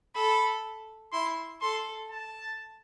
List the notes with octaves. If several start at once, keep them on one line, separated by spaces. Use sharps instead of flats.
A4 B5
E4 C6
A4 C6
A5